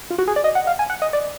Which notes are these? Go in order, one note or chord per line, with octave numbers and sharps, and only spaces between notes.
F4
F#4
G#4
D5
D#5
F#5
F5
G#5
F#5
D#5
D5